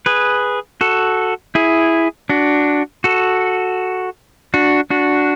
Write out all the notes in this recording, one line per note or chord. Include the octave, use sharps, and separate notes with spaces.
G#4 B4
F#4 A4
E4 G#4
D4 F#4
F#4 A4
D4 F#4
D4 F#4